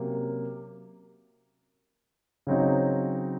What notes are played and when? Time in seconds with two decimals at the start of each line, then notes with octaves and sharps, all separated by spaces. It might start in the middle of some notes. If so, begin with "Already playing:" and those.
Already playing: C3 F#3 A#3 C#4
2.47 C#3 F#3 C4 D#4